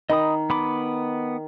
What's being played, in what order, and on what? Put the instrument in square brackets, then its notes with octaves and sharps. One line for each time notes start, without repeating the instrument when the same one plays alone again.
[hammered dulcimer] D#3 [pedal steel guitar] D#5 B5 D#6
[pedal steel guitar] B3 B5 D6